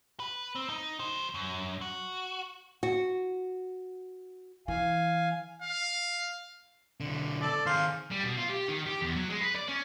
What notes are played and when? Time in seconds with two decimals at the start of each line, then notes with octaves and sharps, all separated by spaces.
0.20 B4
0.55 C4
0.70 D#4
1.00 F#3 C5
1.34 F#2
1.81 F#4
2.83 F#4
4.68 E3 F5 G#5
5.62 F5
7.00 B1 D3
7.41 A4 D5
7.66 D#3 G#4 C5 F5
8.11 G3
8.24 B2
8.38 F4
8.50 G4
8.69 D#3
8.87 G4
9.02 E2
9.16 F#3
9.29 G#3
9.41 B4
9.55 D5
9.68 C#4